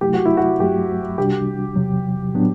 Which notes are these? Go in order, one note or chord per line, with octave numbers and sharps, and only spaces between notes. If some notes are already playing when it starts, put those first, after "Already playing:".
C3 F#3 A3 E4 G4
F#4
E4
F#4
G2 F#3 A3 G4
C2 C3 G3 D4 F#4 G4
E2 C3 F#3
A2 F#3 B3 D4